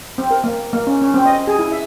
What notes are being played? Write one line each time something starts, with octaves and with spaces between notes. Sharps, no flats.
C4
A#4
A#3
A#3
C#4
C#4
C4
D#5
G#4
E4
E5